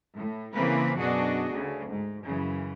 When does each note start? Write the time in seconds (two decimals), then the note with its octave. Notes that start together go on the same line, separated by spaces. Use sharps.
0.17 A2
0.54 C#3 E3 A#3 C4 B4
0.98 F#2 B2 D4 F#4 G#4 D#5
1.52 D2 C#3
1.90 G#2
2.24 F#2 C#3 E3